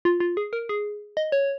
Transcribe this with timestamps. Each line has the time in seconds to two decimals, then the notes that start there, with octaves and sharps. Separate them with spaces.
0.05 F4
0.20 F4
0.37 G#4
0.53 A#4
0.69 G#4
1.17 D#5
1.32 C#5